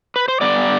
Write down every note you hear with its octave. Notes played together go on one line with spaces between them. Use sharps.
B4
C5
G2 D3 G3 B3 D5